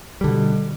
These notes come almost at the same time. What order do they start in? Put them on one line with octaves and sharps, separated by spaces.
G3 D3 B2